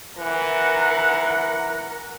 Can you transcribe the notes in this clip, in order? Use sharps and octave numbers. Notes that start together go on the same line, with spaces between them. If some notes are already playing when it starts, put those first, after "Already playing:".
E3 A#4 F#5